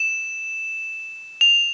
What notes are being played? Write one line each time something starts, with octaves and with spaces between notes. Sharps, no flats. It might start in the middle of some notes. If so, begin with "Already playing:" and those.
Already playing: E7
F7